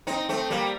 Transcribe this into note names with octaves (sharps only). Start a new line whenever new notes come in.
C4 D#4
A3 C4
G3 A#3